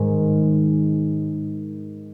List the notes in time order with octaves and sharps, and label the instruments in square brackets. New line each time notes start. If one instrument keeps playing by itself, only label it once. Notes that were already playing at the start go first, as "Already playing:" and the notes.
Already playing: [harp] G#2 D#3 G#3